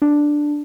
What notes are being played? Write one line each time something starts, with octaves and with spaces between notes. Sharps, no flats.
D4